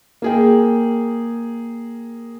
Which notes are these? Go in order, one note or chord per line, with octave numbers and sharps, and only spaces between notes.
A#3 G#4 G5